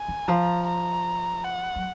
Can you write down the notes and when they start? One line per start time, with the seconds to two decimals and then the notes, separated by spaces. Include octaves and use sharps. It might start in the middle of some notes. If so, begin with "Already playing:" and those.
Already playing: G#5
0.08 D#3
0.28 F3 A#5
0.67 A#5
1.44 F#5
1.76 F#3